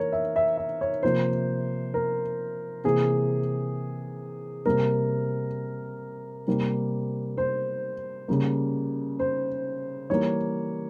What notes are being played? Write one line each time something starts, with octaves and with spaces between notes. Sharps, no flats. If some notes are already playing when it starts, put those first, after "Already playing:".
Already playing: E3 A#3 A#4 C#5
E5
E5
E5
C#5
C3 F3 A#3 C5
A#4
C3 E3 A#3 G#4
C3 G3 A#3 A#4
C3 G3 A#3
C5
C#3 G3 A#3
C5
E3 G3 A#3 C#5